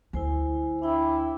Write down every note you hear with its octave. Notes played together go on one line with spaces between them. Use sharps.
D2 E4 C5 G#5
D4 E4 G5 D6